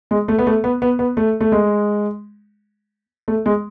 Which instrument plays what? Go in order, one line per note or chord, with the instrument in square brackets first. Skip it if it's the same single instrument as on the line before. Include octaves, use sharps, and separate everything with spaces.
[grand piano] G#3
A3
B3
A3
B3
B3
B3
A3
A3
G#3
A3
G#3